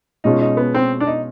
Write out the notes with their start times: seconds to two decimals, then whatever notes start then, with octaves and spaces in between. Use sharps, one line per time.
0.24 B2 G#3 C#4 D#4 F4
0.41 D#4
0.57 B3
0.75 C4
1.00 D4
1.07 D#4